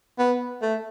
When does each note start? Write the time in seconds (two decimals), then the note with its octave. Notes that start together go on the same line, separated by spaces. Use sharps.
0.19 B3
0.62 A3